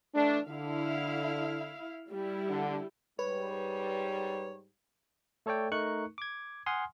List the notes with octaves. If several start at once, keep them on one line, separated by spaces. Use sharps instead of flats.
E3 A3 D4
D3 E4 F5
G3 E4
D3
G#2 G3 B4 C#5
A3 A4 C#5 D5 G5
A3 D#4 A#4 C#6 F#6 C#7
D6 G#6
F#5 G#5 C6 D#6 F6